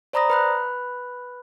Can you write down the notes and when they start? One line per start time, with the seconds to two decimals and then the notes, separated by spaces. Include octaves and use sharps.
0.13 C5 D5 A#5 B5 D#6 A#6
0.30 B4 B5 F#6